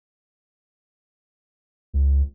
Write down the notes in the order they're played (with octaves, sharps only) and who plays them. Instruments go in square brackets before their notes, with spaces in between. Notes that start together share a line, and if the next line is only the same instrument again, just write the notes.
[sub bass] C#2